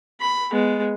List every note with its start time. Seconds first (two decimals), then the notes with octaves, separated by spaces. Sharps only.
0.20 B5
0.52 G#3 B3